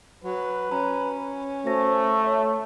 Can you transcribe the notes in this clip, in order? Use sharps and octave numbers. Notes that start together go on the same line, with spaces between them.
F#3 B4
C#4 A#5
A3 F#4 C5 A#6
C#5 E5 A5